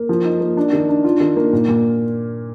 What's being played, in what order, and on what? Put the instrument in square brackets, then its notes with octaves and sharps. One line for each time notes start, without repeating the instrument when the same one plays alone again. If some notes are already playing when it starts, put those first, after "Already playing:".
Already playing: [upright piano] A#3
F3
D#4
A#3
D4
D#3
D4
F4
D#3
A#3
A#2
A#2